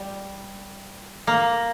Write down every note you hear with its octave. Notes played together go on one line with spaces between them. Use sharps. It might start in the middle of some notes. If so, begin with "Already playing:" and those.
Already playing: G3
A#3